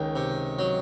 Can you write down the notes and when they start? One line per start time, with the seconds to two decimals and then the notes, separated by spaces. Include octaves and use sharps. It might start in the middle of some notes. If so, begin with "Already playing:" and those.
Already playing: C#2 D#3 D#4
0.16 C3
0.59 F#3